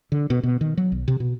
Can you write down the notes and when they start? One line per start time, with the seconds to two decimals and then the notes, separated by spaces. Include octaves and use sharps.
0.12 D3
0.30 B2
0.43 B2
0.61 D#3
0.77 F#3
0.92 B1
1.08 C3
1.20 B2